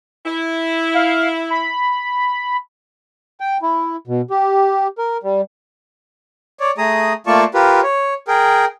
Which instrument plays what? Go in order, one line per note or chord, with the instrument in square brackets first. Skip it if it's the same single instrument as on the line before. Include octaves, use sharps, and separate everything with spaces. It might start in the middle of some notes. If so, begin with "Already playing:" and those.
[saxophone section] E4
[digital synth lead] F5
B5
[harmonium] G5
E4
B2
G4
A#4
G3
[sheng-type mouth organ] C#5 D5
A3 G#4 A#5 D#6
A3 A#3 F4 D5 A5 C#6
F4 G4 A#4 B4
C#5
G#4 A#4 G5